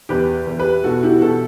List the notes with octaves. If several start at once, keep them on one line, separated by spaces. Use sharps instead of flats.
E2 G4 B4
E2
G4 B4
B2 F#4 A4
E4 G4
B2 F#4 A4